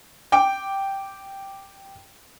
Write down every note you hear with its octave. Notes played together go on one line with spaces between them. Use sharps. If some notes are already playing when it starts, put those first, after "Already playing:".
G5 D6 D7